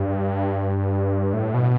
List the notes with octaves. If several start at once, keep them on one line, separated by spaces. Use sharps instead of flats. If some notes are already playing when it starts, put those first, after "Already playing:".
Already playing: G2
A2
B2